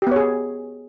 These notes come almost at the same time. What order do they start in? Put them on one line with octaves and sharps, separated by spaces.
G4 B3 C#5 G#4